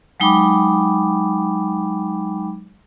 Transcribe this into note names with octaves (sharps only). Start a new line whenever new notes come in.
F#3 G#3 D#4 G5 B5 D6